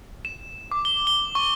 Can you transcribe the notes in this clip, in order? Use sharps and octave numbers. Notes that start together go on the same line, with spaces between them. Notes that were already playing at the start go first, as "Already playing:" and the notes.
E7
D6
G7
G7
C#6